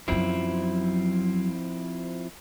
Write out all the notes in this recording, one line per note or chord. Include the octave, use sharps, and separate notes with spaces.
F#2 F3 F#3 C4 E4